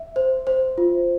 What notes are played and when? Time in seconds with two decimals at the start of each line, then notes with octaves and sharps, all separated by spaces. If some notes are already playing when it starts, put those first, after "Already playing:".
Already playing: E5
0.16 C5
0.47 C5
0.78 F4